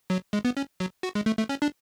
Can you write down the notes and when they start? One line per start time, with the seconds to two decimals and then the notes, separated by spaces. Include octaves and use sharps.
0.10 F#3
0.33 G#3
0.45 B3
0.57 C#4
0.80 F#3
1.03 F#4
1.15 G#3
1.26 A3
1.38 A3
1.49 C#4
1.62 D4